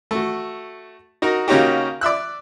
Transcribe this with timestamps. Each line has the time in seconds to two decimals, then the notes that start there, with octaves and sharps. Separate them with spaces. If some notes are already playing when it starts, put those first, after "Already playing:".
0.11 A3 F#4
1.22 D#4 F#4 A#4
1.48 C#3 A#3 C#4 D#4 F#4 G4
2.01 D5 E5 E6 F#6